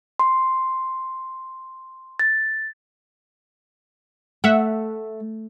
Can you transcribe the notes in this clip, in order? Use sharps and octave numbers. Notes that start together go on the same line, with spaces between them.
C6
A6
A3 E5 F#5